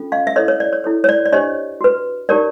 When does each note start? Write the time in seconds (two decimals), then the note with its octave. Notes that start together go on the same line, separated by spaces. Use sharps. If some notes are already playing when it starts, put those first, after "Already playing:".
Already playing: C#4 F4 A4
0.12 D#5 F5
0.27 E5
0.36 E4 A4 C#5 D#5
0.48 C#5
0.60 D5
0.73 C#5
0.84 E4 A4 C#5
1.04 C#5
1.09 D5
1.26 D5
1.33 D4 G4 C5 C#5 D#5
1.81 F#4 B4
2.29 D#4 G4 A#4 C#5 D5